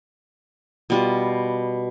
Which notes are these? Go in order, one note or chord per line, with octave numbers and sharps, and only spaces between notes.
B2 G3 F4